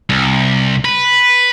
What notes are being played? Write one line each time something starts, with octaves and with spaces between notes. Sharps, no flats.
C2
B4